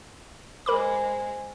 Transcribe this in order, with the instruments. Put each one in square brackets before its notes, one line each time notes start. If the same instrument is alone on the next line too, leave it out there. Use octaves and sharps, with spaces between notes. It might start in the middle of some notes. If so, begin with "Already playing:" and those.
[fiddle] G#3 C5 [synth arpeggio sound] A#4 B5 D6